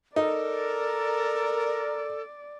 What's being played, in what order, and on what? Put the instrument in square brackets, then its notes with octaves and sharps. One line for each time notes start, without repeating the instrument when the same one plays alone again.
[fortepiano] D#4 [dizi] A4 [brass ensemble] A#4 [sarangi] D5